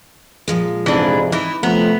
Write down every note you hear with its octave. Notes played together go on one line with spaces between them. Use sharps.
A#2 F3 G#3
F2 G#2 C3 E3 D4
E3 D#4 E4
C3 F3 A3 B3 A#5